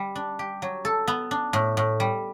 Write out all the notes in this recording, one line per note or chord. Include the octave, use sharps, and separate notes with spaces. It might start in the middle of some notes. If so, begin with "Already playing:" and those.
Already playing: G3
D4
G4
F#3
A4
B3
D4
A2
A2
G3